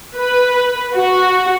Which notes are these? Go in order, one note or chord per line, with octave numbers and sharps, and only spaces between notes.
B4
F#4